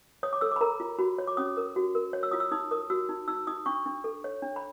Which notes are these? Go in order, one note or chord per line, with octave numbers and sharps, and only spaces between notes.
C#5 D#6
D6
A4 E6
B5 D6
A#4 A#5
F4
F#4 B5
C#5
D6
C#4 D#6
A#4
F#4
A#4
C#5
E6
F4 D#6
E6
D#4 D#6
A#4 D#6
F#4 E6
D#4
D#4 E6
D#4 D#6
D4 C#6
D4
A4
C#5
D4
B5